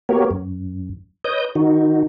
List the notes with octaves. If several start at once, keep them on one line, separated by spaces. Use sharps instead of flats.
A#3 B3 F#4 G4 A#4 C#5
F#2
B4 C#5 D#5 D#6 G6
D#3 D#4 F#4